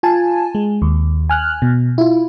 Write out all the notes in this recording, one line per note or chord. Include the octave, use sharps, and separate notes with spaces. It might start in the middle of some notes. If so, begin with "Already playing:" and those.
F4 G#5 A5
G#3
D#2
G#5 F6 F#6
B2
E4 F4